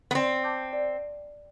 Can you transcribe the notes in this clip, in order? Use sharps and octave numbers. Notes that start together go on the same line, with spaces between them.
B3
C4 D5
A5 D6 G6
D5